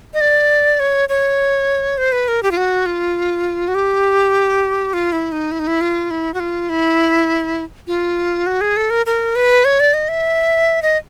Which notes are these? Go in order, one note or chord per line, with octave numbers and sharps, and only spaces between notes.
D#5
D5
C#5
C#5
C5
B4
A#4
G4
F4
F#4
F4
F#4
G4
F4
E4
D#4
E4
D#4
E4
F4
E4
F#4
F4
E4
F4
F#4
G#4
A4
A#4
A#4
B4
C#5
D5
D#5
E5
D#5